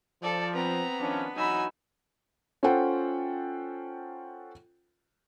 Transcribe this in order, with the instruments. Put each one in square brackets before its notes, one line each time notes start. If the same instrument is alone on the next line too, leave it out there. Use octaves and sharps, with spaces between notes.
[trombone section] F3 [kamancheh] A4 [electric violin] D5
[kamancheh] B3 B4 [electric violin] C4 A#5
[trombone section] D#3 F3 C#4 [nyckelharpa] D4
[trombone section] E3 F#3 F#4 [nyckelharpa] D#4 B5 [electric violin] G#5 E6
[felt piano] C#4 F4 A4 C5 F#5 G5